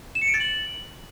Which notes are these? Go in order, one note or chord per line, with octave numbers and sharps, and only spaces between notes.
E7
C#7
D7
A6
F#7